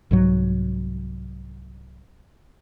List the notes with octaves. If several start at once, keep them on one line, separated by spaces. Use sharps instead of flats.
C2 G#2 F#3